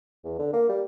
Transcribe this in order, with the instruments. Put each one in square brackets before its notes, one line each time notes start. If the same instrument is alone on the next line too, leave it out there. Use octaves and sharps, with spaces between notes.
[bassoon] E2
D3
A#3
G3